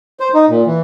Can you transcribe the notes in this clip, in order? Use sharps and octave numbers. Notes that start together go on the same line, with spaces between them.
C5
D#4
A#2
E3